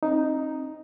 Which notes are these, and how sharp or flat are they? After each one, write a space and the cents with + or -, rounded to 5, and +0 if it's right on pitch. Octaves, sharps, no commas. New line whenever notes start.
C4 +40 D#4 +0